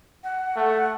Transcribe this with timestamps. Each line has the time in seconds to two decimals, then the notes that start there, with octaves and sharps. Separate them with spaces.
0.24 F#5
0.56 A3